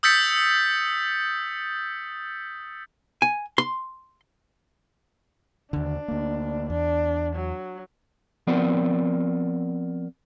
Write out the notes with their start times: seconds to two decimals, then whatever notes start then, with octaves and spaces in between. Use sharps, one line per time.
0.03 D#6 E6 G6 A6 B6 C#7
3.22 G#5
3.58 C6
5.73 D#2 D3 D4
6.08 D2 A#3
6.70 E2 D4
7.36 F#3
8.47 F3 B3 C4 A#4 D5